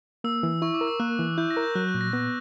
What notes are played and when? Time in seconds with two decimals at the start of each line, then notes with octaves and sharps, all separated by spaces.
0.24 A#3 E6
0.43 E3
0.62 E4 C#6
0.74 D6
0.81 A#4
0.87 E6
1.00 A#3 F#6
1.19 E3
1.38 E4 G6
1.50 A#6
1.57 A#4
1.63 G6
1.75 F#3 F#6
1.88 F#6
1.95 A#2
2.01 A#6
2.13 B3 A#6